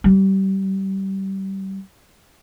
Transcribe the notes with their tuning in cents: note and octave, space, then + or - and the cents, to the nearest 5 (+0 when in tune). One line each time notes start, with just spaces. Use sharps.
G3 -25